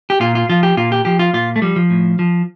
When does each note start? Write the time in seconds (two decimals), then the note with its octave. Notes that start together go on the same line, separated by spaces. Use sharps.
0.10 G4
0.20 A#2 F4
0.35 F4
0.49 F3 F4
0.63 G4
0.77 A#2 F4
0.92 G4
1.05 F3 G4
1.19 F4
1.33 A#2 F4
1.56 A3
1.62 F3 G3
1.76 F3
1.90 A2
2.19 F3